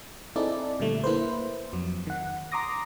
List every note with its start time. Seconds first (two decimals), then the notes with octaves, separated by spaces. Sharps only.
0.36 C4 D#4 E4 G#4 A4 D5
0.80 A#2 D3 G3 A3
1.04 A#3 E4 B4 C5
1.73 F2 F#3
2.07 D#3 F#5
2.52 A#5 C6 D6 D#6 A#6